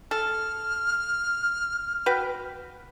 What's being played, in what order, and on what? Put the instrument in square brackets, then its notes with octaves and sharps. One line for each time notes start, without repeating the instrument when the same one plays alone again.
[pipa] A4 [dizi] F6
[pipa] F#4 B4 G5